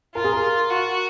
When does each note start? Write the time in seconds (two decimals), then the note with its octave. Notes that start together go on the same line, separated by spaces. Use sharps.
0.15 F4 A#4
0.24 G#4
0.33 A#4
0.70 F#4